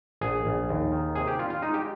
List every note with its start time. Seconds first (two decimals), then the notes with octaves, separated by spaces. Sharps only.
0.21 A#1 G#4
0.45 A#1
0.69 D#2
0.92 D#3
1.15 C3 G#4
1.27 G4
1.39 G3 F4
1.50 F4
1.62 G#3 D#4
1.74 G4